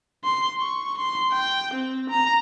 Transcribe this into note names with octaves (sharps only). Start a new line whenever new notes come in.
C6
C#6
C6
G5
C4
A#5